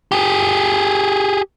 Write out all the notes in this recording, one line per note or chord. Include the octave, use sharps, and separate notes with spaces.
G4 G#4